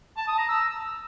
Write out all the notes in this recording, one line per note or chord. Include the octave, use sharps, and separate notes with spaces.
A5
D#6
A#5
E6